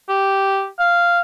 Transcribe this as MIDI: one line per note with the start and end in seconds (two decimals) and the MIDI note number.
0.09 0.66 67
0.79 1.21 77